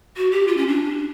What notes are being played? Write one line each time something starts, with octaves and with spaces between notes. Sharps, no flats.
F#4
G4
F4
C#4
D4